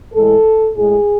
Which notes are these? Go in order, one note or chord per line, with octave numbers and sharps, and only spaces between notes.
A2 E3 G#3 A4
A2 G#3 G#4